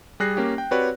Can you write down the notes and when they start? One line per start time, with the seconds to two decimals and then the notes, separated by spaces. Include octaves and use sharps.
0.20 G3 G#4 F#6 A#6 C7
0.37 A#3 C#4 G4
0.58 G5
0.71 C4 F#4 G4 B4 C#5 D5